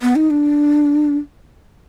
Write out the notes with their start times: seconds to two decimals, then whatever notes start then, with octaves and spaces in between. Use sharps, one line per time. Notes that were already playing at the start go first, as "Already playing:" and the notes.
0.02 B3
0.16 D#4
0.30 D4